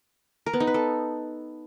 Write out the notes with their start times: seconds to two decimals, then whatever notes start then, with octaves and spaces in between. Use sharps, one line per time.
0.46 A#4
0.53 B3
0.60 D#4
0.67 B4
0.74 A4